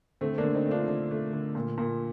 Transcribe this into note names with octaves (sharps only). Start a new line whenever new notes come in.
D3 A3 C4
A#3 D4
D3
C4 D#4
A3
D4 F4
D3
A3
D3
A#2
A#2